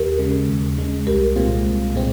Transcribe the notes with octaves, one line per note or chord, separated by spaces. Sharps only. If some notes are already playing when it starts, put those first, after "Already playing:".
Already playing: D#2 G4 A#4
C#3 G#3
D#2
C#3 G#3
C2 G4 A#4
A#2 G#3 C4 F4
C2
A#2 G#3 C4